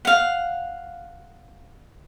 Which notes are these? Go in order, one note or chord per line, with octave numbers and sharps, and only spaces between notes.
F5 F#5